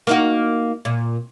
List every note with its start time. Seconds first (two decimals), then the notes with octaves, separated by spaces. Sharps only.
0.07 A#3 D#4 F#4
0.85 A#2